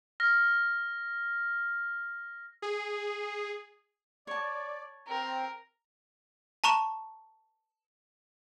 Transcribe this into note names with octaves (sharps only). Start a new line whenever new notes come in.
F6 A#6
G#4
C#5 D5 A5
C4 A#4
A5 A#5 C#6 E7